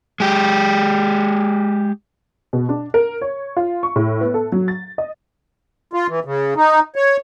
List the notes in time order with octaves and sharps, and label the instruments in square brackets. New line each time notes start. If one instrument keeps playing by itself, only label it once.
[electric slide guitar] G#3 G4
[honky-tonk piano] B2
D4
A#4
C#5
F4
C#6
A2
B3
A4
F#3
A6
D#5
[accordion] F4
E3
C#3
D#4
C#5